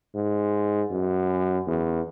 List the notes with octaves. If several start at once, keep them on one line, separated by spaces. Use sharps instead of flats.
G#2
F#2
E2